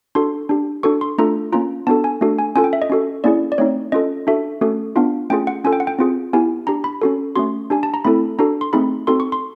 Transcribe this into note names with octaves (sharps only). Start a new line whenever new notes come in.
D4 F#4 A4 C6
D4 G4
D4 F#4 A4 C#6
C6
A3 D4 F4 A4 A#5
A#3 C#4 F4 A#5
B3 D4 F#4 A4 A5
G#5
A3 D4 F#4 A4
G#5
C#4 F4 A4 G#5
G5
E5
D#5
C#4 F#4 A4
A#3 C#4 E4 G#4 D5
D5
A3 C4 D#4 C#5
C#4 F4 A4 D#5
D4 F#4 A4 E5
A3 C#4 F#4 A4
B3 D4 F4 F5
A3 C#4 F4 G#4 G5
F#5
C#4 F4 A4 G#5
G5
F#5
G5
C4 F4 G#4
B3 E4 G4 G#5
D4 G4 A#5
B5
C#4 F#4 A4
A3 C#4 F#4 C6
D4 G4 G#5
A5
A#5
A3 C4 E4 A4 B5
D4 F#4 A4 A#5
C6
A3 C4 D#4 G#4 B5
C4 D#4 F#4 A4 C6
C#6
C6